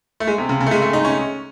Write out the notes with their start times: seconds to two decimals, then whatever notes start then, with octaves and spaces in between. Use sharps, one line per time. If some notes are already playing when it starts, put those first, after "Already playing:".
0.20 A3
0.27 G#3
0.38 C3
0.49 C#3
0.61 C#3
0.66 A3
0.71 G#3
0.82 A3
0.93 D#4
1.05 C#4